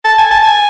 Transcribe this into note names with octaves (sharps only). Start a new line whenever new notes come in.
A5
G#5
A5
G#5